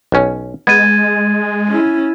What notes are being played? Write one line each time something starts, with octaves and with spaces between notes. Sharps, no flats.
B1 C#4
G#3 B3 G#6 A6 D#7
C#4 E4